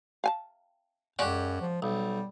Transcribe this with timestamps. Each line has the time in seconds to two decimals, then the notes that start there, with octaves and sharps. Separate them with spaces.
0.24 F5 G#5 A5
1.19 F#2 C#3 G#3 F#4 G4 D5
1.61 F3
1.82 B1 G3